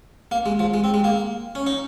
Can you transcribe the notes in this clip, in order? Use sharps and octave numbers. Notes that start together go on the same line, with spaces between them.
A#3
G#3
F3
G#3
C4
G#3
A#3
C#4
D#4